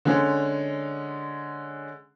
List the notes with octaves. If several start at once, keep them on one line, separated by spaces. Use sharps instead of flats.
D3 G#3 C#4